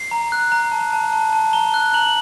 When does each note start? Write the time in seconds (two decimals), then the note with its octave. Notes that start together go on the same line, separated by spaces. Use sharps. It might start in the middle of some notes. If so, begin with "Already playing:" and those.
Already playing: C7
0.11 A#5
0.32 F#6
0.52 A#5
0.72 A5
0.93 A5
1.13 A5
1.33 A5
1.53 A#5 G7
1.74 F#6
1.94 A#5 F#7